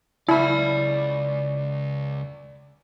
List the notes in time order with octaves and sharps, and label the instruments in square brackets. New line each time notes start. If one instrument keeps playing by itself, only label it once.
[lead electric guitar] C#2 [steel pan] E4 [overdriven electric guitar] D5 B5